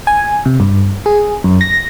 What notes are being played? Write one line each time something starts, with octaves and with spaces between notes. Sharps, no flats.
G#5
C3
G2
G#4
F#2
A#6